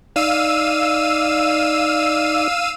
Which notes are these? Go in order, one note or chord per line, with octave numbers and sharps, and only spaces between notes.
D#4 D5 F5 E6 D#7